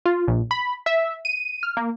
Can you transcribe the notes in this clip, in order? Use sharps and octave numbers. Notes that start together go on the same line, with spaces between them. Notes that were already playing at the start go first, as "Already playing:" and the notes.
F4
A#1
B5
E5
D#7
F6
A#3